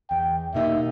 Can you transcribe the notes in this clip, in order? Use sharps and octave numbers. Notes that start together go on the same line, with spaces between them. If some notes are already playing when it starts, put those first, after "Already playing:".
E2 G5
B2 A#3 D#4 G4 E5